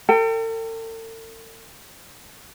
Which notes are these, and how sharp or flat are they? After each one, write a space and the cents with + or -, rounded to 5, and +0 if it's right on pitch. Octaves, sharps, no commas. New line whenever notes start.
A4 +45 G5 +0